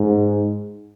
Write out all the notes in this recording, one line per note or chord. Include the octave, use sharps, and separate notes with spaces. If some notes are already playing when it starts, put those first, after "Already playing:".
Already playing: G#2